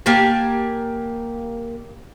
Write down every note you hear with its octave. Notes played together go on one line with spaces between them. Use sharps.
A#3 G4 G#5 A5